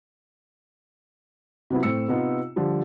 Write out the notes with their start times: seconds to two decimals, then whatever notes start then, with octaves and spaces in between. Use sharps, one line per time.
1.70 C3 F#3 B3 E4
1.83 A2 C4 E6 C#7
2.08 C3 B3 D#4 F4
2.56 D3 F3 G3